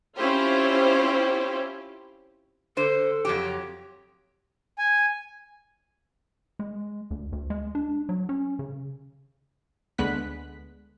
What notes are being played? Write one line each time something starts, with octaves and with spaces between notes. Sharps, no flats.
C4 C#4 E4 F4 G4 C5
D3 A4 C5
F2 F#3 G4
C#5
G#5
G#3
D2
D2
G#3
D4
F#3
C#4
C#3
D2 D3 G#3 B3 F#6 B6